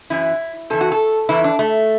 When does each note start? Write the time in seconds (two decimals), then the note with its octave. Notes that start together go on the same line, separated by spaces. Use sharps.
0.10 F#2 E3 E4
0.70 E2 E3 A4
0.81 F#4
0.92 A4
1.29 E2 E3 E4
1.44 D4
1.59 A3